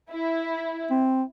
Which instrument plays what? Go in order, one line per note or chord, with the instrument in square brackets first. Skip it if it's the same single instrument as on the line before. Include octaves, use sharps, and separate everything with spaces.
[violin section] E4
[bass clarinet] C4